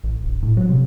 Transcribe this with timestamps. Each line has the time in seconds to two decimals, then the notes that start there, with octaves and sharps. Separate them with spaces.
0.04 A1
0.23 D1
0.43 A2
0.57 F#3
0.69 C3